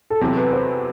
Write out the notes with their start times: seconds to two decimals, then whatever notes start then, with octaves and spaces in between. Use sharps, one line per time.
0.10 A4
0.21 E2 C3 F#3 C4 E4 A4
0.37 B4
0.53 C5